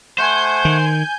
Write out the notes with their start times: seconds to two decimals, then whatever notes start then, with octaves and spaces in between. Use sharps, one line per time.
0.18 A3 C5 F#5 G#5 G6
0.65 D#3